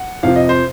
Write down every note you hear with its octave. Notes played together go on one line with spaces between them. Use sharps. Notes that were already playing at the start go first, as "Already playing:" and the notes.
Already playing: F#5
F2 C3 F3 F5
D#5
C5